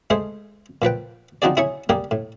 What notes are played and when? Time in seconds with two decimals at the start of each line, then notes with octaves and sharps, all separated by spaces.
0.10 G#3 A3 G#4 C5
0.82 A#2 F3 B4 G5
1.42 F3 C4 D#4 F#4 G#4 D5
1.57 E4 G#4 C#5 E5 G#5 C#6
1.89 G3 A#3 G4 G#4
2.11 A2